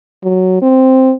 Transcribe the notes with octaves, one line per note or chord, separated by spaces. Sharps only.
F#3
C4